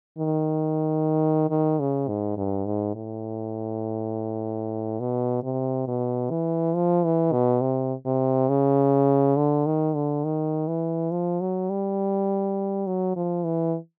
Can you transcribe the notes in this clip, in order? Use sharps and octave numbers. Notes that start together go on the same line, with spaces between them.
D#3
D#3
C#3
G#2
G2
G#2
A2
B2
C3
B2
E3
F3
E3
B2
C3
C3
C#3
D3
D#3
D3
D#3
E3
F3
F#3
G3
F#3
F3
E3